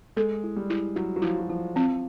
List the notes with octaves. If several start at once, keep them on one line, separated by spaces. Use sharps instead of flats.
G#3 A4
E4
G3
E4
F#3 E4
F#3
F3 E4
F#3
F3 E4
F3 C4